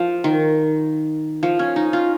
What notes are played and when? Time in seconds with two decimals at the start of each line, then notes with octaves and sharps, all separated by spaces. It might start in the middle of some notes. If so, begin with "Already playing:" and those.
Already playing: F3
0.24 D#3
1.43 F3
1.59 C#4
1.76 D#4
1.93 F4